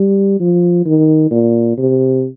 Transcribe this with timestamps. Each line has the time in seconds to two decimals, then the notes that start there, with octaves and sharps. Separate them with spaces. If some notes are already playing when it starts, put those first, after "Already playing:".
Already playing: G3
0.39 F3
0.85 D#3
1.31 A#2
1.78 C3